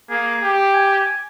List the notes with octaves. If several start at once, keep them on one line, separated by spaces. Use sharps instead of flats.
A#3 G#4
G4
G#5